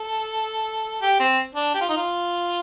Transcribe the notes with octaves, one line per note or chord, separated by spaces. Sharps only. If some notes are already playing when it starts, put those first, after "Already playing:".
Already playing: A4
G4
C4
D4
G4
F4
D#4
F4